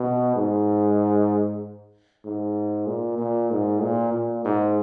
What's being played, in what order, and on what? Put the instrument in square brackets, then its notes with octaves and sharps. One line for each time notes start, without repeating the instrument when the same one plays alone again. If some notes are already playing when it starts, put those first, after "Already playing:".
Already playing: [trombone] B2
G#2
G#2
A#2
A#2
G#2
A#2
A#2
G#2